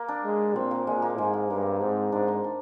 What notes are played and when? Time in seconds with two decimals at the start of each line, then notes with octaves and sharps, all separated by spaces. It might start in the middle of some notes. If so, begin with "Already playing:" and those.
Already playing: A#3
0.08 D4
0.25 G#3
0.55 A#2 C4
0.71 A#3
0.87 A#2 G#3
1.02 A#3
1.18 G#2 G#3
1.33 G#3
1.50 G2 A#3
1.80 G#2 C4
2.12 G#2 D4
2.28 D#4
2.44 D4